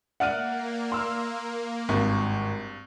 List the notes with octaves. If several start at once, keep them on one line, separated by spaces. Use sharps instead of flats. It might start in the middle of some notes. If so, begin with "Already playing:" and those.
A#3 D5 E5 F#5 F6 D#7
C6 E6 F6
G#1 G2